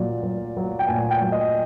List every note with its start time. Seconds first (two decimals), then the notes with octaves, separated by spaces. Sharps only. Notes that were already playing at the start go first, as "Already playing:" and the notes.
Already playing: A#2 F#3 D5
0.23 F#3
0.57 F#3
0.79 G5
0.88 A#2 G#5
1.11 G5
1.21 F#3
1.32 D#5